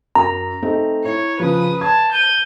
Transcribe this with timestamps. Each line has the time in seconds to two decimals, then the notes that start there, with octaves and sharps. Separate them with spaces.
0.15 F#2 A#5
0.62 A3 C4 D#4
1.05 E4 C#5
1.40 C#3 F3 B4 D#6
1.81 A5 G#6
2.12 G6 D#7